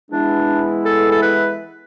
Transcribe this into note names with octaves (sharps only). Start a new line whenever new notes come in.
E3 G#3 B3 D4 E4
A4
A4
B4